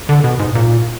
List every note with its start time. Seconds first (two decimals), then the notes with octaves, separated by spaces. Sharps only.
0.09 D3
0.24 B2
0.39 G#2
0.55 A#2